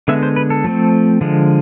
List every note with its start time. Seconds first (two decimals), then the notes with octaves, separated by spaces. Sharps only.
0.08 D3 G#3 B3 E5
0.23 C5
0.36 B4
0.50 A4
0.64 F3 A3 C4
1.21 D3 F3 G#3